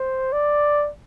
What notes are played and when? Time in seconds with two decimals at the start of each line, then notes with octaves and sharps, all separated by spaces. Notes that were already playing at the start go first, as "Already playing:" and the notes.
Already playing: C5
0.33 D5